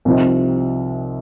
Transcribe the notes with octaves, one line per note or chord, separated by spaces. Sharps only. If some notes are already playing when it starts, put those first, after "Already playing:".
C2 C3 F3 C4 D#4